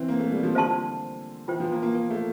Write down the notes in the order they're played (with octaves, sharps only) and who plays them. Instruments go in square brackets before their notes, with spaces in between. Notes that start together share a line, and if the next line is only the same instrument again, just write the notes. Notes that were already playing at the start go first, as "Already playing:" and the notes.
Already playing: [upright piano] E3 C4
A#3
A3
G3
F3
[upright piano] D3 [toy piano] C5 F5 A5 C6
[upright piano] E3 [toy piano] F4 C5 G5
[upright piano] F3
A#3
A#3
A#3
A3